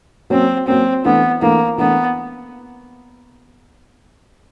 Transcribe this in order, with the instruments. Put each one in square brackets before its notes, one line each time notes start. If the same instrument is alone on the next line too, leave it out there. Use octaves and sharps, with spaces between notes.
[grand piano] F#3 A#3 C#4 [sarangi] C4
[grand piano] F#3 A#3 C#4 [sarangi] C4
[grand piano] E3 A3 D4 [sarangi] B3
[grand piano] E3 A3 D4 [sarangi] A#3
[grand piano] E3 A3 D4 [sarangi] B3